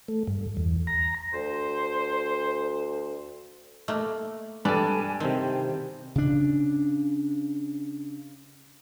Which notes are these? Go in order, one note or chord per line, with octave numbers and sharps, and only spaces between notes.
A3
G2
E2
A#5
D2 C5
A3 A#3
G2 A4 B4 D5 G#5
C3 D#3 C4 C5
C#3 D4